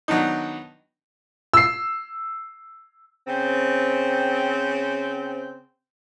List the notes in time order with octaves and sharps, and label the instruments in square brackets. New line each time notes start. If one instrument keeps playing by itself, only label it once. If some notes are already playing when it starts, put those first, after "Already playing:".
[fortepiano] D#3 F#3 B3 D4 D#4
[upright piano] E6 C7
[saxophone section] C#3 C4